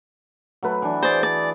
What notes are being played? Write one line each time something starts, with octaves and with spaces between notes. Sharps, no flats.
F#3 A3 B4
E3 D4
G#4 C5 D5
D5